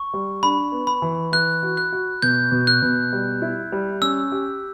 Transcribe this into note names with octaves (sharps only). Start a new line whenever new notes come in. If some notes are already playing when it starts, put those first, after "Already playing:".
Already playing: C#6
G3
D4 B5
B3
B5
E3
E3 F#6
F#4
F#6
F#4
B2 G6
B2
F#6
B2
G3
E4
G3
C#4 E6
G4